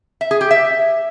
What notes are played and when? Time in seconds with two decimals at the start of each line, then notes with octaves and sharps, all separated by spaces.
0.21 E5
0.31 G#4
0.41 G4
0.51 E5